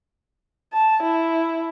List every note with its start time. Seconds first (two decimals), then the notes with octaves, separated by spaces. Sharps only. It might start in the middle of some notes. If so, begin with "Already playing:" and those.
0.73 A5
1.03 E4